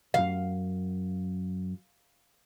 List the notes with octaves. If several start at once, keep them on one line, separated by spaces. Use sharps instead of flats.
C#2 F#2 F5